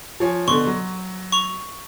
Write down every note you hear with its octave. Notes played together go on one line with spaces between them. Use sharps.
F3 C#5 G#5
B2 D3 C6 C#6
F#3
C#6 F7